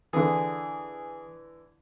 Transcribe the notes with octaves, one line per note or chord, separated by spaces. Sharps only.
D3 E3 G#4